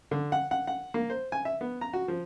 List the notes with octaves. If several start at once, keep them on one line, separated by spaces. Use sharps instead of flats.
D3
F#5
F#5
F#5
A#3
C5
G#5
E5
B3
A#5
F#4
F3